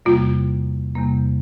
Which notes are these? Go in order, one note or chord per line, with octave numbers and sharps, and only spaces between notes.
E2 C3 G3 A#3 F4
E2 C3 G3 A#3